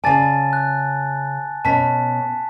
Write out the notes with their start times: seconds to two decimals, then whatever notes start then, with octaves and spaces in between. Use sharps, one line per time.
0.04 C#3 D5 G#5 A5 A6
0.53 F#6
1.65 B2 C#4 A5 B6